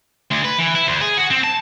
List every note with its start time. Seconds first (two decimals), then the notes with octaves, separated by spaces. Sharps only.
0.31 D2
0.45 B4
0.59 E3
0.75 E4
0.88 D2
1.01 G#4
1.17 F#4
1.31 C4
1.44 A5